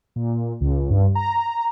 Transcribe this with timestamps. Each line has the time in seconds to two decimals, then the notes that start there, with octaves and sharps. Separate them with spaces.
0.16 A#2
0.61 C#2
0.90 G2
1.15 A#5